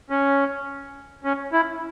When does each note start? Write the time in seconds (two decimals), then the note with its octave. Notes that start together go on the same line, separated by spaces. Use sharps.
0.10 C#4
1.24 C#4
1.53 E4